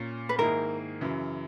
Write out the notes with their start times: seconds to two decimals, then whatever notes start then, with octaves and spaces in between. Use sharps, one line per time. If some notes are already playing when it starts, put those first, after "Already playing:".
Already playing: A#2 A#3 C#4
0.29 B4
0.38 G#2 D#3 A#3 E4 G#4 A#4
1.01 F#2 C#3 E3